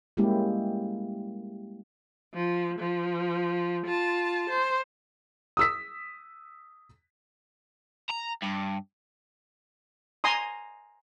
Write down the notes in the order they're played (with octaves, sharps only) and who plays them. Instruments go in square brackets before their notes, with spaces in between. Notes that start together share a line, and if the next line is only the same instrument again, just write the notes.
[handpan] G3 G#3 A#3 C#4 E4 G4
[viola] F3
F3
F4 A5
C5
[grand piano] D#6 E6 B6
[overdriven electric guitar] A#5
G2
[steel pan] G#5 A#5 C6 D#6